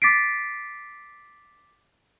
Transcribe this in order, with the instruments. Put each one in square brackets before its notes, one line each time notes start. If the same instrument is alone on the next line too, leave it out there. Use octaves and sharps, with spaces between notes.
[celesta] D6 A6 B6 C7 D7